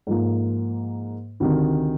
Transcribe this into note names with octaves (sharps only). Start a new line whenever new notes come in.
G#2 F3 A#3
D2 C3 D#3